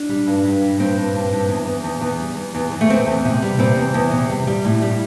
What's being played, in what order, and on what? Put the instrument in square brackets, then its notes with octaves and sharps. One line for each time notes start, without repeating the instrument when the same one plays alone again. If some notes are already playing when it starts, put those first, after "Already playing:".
Already playing: [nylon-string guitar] D4
G3
G2
G2
G3
G2 C4
G2
G2
G2
E2
E2
E2
E2
G3
E2
E2
E2
A3
E2 C4
E2
C3
G3
C3 C4
E2
E2
C3
G3
G3
A2
G3